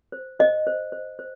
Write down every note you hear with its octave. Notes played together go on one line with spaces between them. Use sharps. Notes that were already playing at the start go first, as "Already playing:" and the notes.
C5
C5 D#5
C5
C5
C5